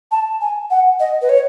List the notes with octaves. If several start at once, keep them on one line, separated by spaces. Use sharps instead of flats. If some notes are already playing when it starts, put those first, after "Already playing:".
A5
G#5
F#5
D#5
B4
C#5